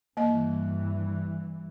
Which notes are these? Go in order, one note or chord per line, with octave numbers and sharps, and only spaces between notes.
G2 E3 A#3 D#5